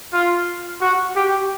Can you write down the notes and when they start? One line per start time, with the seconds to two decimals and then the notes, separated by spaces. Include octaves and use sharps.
0.13 F4
0.81 F#4
1.16 G4